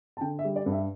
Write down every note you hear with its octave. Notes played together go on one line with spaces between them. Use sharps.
A5
D3 G5
E5
G3
D5
G2
E5